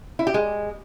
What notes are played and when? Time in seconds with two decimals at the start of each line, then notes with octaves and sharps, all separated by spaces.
0.19 E4
0.27 G4
0.34 G#3